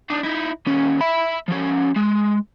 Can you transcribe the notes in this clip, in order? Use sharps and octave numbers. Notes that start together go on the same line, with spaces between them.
D4 D#4
D#4 E4
D#2 C#4
E5 B5
F3 C#4
G#3